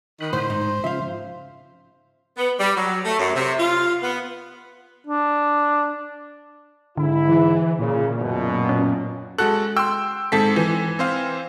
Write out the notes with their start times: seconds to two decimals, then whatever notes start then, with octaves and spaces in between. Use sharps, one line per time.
0.20 D#3 B5 D#6 F#6
0.33 A2 D3 C5
0.50 G#2 D#4
0.84 C#3 F3 E5 F5
2.37 B3
2.59 G3
2.76 F#3
3.05 A3
3.19 F#2
3.35 C3
3.59 F4
4.03 B3
5.07 D4
6.97 G#2 D3 E4
7.29 E3
7.79 A#2 C#3
8.19 F#2 B2
8.69 C#4
9.38 G#3 F#4 A4 F#6
9.77 G5 C6 E6
10.32 G#2 C4 A4 B6
10.56 E3
10.99 C4 C5 F5